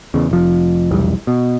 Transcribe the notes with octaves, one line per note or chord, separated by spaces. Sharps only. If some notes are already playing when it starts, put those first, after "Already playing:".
E2 C#3
F1 F3
F1 B1 E2 G3
B2